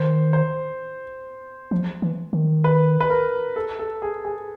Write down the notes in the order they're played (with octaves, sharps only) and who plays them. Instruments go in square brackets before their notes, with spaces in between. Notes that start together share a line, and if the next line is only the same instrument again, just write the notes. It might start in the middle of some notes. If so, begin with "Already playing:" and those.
Already playing: [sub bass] D#3 [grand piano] C5
[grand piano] C5
[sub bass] F3
E3
D#3
[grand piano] B4
B4
A#4
A4
A4
G#4
G#4